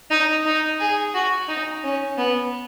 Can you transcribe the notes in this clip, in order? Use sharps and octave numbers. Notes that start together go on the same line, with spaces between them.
D#4
D#4
G#4
F#4
D#4
C#4
B3